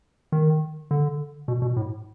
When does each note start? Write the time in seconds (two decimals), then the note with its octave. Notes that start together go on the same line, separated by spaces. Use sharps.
0.32 D#3
0.91 D3
1.48 B2
1.62 B2
1.76 A2